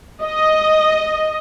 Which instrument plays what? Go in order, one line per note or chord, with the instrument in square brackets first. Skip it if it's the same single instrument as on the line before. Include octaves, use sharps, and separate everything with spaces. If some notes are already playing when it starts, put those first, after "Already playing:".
[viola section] D#5